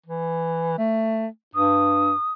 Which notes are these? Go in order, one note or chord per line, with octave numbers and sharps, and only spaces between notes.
E3
A3
G2 D#6